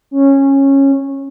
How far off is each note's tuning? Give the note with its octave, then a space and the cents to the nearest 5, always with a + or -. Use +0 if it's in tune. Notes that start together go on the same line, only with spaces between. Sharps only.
C#4 -15